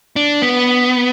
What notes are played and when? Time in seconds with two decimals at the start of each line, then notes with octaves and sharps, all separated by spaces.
0.16 D4
0.42 B3